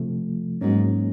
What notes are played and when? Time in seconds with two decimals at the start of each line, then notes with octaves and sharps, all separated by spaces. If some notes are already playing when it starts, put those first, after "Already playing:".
Already playing: C3 F3 A3
0.61 G#2 F#3 A#3 C#4